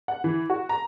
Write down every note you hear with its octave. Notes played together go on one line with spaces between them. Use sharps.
F#5
E3
F#4
A#5